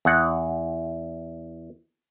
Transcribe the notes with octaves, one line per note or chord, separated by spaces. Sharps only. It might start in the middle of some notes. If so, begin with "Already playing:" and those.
E2 F#5